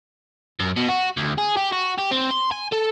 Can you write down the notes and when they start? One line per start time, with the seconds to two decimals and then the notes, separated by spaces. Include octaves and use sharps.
0.60 F#2
0.77 B2
0.89 F#4
1.17 D2
1.38 G#4
1.57 G4
1.73 F#4
1.99 G4
2.11 C4
2.31 C6
2.51 G#5
2.72 A4